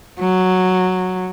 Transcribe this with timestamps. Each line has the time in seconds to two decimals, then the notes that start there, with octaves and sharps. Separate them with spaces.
0.20 F#3